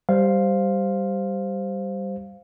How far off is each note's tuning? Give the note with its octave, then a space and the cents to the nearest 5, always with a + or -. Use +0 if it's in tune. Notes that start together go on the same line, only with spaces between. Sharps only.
G3 +0 C5 +0 F5 +0